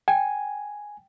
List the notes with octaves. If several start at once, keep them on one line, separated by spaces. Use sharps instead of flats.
G5 G#5